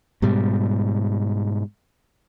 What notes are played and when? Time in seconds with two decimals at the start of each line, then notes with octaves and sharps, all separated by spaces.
0.22 G#2 B2 G3